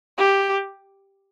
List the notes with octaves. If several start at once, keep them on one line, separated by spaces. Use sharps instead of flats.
G4